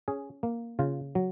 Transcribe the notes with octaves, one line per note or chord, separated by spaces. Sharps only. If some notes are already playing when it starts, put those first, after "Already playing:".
C#4 G#4
A#3
C#3 F4
F#3